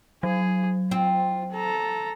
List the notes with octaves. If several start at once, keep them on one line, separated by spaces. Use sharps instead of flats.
F#3 G#4
C4 F4
A4 A#5